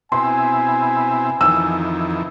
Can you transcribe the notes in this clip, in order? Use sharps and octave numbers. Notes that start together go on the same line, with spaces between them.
B2 C4 E4 G#5 C6
F2 D#3 E3 E6